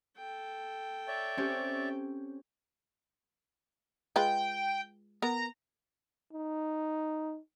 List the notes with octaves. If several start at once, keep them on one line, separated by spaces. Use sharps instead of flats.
A4 G5
C#5 D5 E5
C4 C#4 G4
G#3 F4 B4 G5
B3 A#4 A#5
D#4